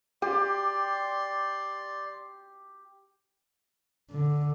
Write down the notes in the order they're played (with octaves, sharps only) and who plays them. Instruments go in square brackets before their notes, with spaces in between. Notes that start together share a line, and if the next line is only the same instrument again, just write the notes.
[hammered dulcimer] G4 [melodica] D5 C6
[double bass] D3